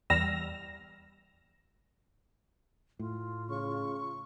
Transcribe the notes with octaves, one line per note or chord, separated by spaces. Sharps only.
E2 G3 E6 F6 A#6
A2 F4
C#3 C#6